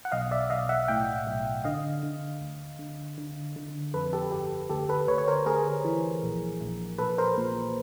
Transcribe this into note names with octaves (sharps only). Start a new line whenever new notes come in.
F#5
B1 D#5 F5
D5 E5
B1 D#5 F5
E5 F#5
A2 F5 G5
B1
D3 D#5 F5
D3
D2
D3
D3
D3
F2 A4 B4
G4 A4
G1 G4 A4
D2 G4 A4
A4 B4
D2 B4 C#5
C#5
A#4 C5
D2 G#4 A#4
E3
A#1
A#1
A#1 A4 B4
A#4 C5
A#2